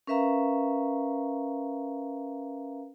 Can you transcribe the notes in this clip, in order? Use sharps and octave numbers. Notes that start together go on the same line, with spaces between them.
C#4 A#4 B4 E5 F5 A#5